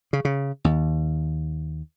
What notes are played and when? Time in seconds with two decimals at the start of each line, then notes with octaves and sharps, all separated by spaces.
0.13 C#3
0.25 C#3
0.65 D#2